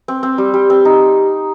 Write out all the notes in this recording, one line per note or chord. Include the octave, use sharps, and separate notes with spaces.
C4
C4
G3
G3
C4
D#4